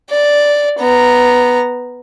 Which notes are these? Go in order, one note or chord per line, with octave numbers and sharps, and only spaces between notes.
D5
B3 A#5